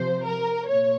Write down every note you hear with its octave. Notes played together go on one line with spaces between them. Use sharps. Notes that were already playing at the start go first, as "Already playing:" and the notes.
Already playing: C3 F3 C5
A#4
A#2 C#5